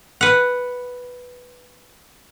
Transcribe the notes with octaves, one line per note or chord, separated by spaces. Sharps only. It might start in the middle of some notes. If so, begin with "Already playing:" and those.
B4 F#5